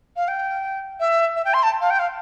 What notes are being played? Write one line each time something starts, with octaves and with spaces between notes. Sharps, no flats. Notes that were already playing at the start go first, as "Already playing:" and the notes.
F5
G5
E5
E5
G5
C6
A5
F5
G5
F5